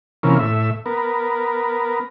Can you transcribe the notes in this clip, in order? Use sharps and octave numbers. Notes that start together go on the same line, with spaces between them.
C3 E3 A#3 C#4 F4
A2 E5
B3 A#4